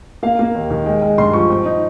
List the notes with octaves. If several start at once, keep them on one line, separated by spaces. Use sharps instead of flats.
A#3 F5
A#3
D#2
D#3
G#3 G5
G#3
G2 C6
F3 C#6
C4
D#4